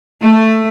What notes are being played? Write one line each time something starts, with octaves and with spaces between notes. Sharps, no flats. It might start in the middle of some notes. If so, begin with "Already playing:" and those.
A3